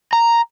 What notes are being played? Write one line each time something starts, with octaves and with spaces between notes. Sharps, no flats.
A#5